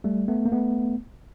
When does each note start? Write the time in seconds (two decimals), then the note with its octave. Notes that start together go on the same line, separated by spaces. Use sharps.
0.04 G3 A3
0.28 A3 B3
0.46 A#3
0.52 A3 B3